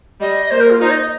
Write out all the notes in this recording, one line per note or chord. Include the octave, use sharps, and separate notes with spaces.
G3 D#5
D#5
A#3 C5
A#4
F4
D#4 C5
D#5
D#5